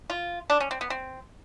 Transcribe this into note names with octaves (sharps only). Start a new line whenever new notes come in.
F4
D4
C#4
C4
B3
C4